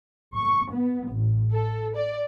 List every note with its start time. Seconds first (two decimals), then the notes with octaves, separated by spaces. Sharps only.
0.34 C#6
0.71 B3
1.11 A1
1.52 A4
1.96 D5